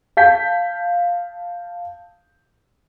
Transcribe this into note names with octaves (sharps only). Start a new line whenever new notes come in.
F5 A5 G6 B6